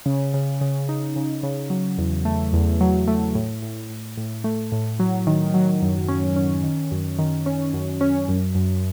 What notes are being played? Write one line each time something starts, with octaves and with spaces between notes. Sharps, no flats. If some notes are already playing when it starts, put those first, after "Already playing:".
C#3
C#3
C#3
D#4
C#3
C#3
F#3
E2
A3
E2
F#3
A3
A2
A2
A2
A2
A3
A2
F#3
D#3
F#3
F#2
C#4
C#4
D#3
F#2
D#3
C#4
F#2
C#4
F#2
F#2